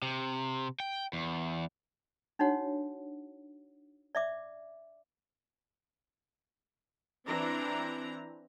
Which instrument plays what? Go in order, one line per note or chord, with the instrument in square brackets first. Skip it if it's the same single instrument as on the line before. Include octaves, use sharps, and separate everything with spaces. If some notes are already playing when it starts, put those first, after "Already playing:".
[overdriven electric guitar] C3
G5
E2
[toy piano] D4 D#4 F#4 C#5 F#5
D5 E5 D6
[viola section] E3 C4 D4 A#5